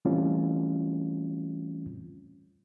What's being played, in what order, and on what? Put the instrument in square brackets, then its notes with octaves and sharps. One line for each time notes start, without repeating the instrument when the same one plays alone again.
[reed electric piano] E3 G3 A3 C4 C#4 F4